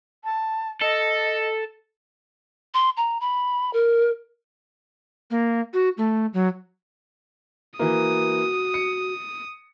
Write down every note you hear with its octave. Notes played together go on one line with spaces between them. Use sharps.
A5
A4 D#5
C6
A#5
B5
A#4
A#3
F#4
A3
F#3
E3 A#3 F#4 D#6
C#7